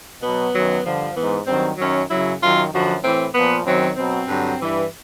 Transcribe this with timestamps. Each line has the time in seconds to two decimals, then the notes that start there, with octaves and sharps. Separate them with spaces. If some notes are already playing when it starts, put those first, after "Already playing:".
0.21 B2 F#3 B3
0.53 F#2 D#3 F#3
0.83 G2 D3 F3
1.15 E3 B3
1.20 G#2
1.46 G2 D#3 F#3 C4
1.77 F#2 D#3 F#3 C#4
2.09 F#2 C#3 F#3 E4
2.40 F#2 D#3 F#3 F4
2.71 F#2 D3 F3 F#4
3.03 A2 E3 C4
3.33 A#2 F3 B3
3.65 F#2 D#3 F#3 C4
3.96 B2 F#3 C4
4.28 G2 D3 F#3
4.59 G2 E3